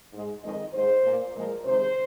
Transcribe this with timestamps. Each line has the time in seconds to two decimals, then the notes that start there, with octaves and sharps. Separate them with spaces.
0.13 G#2 G#3
0.44 F2 D#3 G#3 D#5
0.74 G#2 G#3 C5
1.04 A#2 A#3
1.35 A#2 F3 G#3 A#4
1.65 C3 D#3 G#3 C5